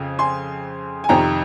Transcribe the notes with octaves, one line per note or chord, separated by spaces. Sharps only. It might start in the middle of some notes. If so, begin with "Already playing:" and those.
Already playing: F2 C#3
G#5 C6
G#5
F2 C3 D#3 G5 A#5